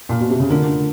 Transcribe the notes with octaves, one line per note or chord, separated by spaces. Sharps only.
A#2
B2
C3
C#3
D3 A3 D4 F4 A#4